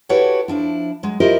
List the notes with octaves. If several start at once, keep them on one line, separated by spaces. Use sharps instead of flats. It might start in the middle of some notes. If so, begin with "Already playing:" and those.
E4 F#4 G4 A4 B4 C#5
F3 D4 E4
F#3 G#3
E4 F4 G4 A#4 C5 D#5